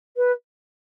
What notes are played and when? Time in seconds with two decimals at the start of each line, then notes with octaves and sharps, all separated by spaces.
0.17 B4